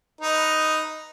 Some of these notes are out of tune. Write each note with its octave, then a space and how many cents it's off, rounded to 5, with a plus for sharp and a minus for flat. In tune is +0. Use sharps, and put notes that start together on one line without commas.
D#4 +0 B4 +0